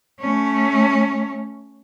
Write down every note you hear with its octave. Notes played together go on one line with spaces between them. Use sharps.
A3 C#4